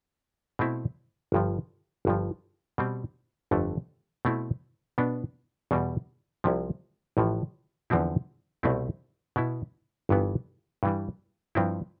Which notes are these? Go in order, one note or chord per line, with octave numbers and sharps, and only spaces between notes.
B2 A3 C4 E4
G1 G2 F3
G1 G2 F3
B2 G3 C4
G1 F2 D3 A3
B2 A3 C4 E4
B2 B3 D4
E2 B2 G3
C2 C3 F3
A1 A2 F3
E2 D3 F3 C4 E4
C2 B2 A3 C4 E4
B2 B3 E4
G1 G2 E3 B3
G2 E3 G3
G2 F3 C4 E4